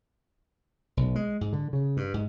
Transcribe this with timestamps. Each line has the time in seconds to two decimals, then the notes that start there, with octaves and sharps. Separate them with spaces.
0.97 B1
1.16 G#3
1.41 G#2
1.53 D3
1.73 C#3
1.97 G2
2.14 G#2